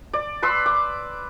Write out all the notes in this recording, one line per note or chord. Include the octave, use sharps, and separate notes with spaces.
D5
B4 C6 E6
D6